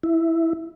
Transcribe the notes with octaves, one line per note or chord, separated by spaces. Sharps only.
E4